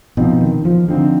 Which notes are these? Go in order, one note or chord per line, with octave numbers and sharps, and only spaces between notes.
B2 F3 C4 D#4
D#3
F3
D3 F3 C4 D#4